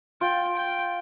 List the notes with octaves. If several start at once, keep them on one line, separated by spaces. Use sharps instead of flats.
F4 G5
G5